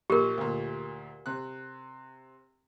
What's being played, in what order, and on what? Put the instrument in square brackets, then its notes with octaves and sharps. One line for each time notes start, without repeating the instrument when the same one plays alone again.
[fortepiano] A#1 A#2 [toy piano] G4 A#4
[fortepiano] D2 A#2
C3 F#6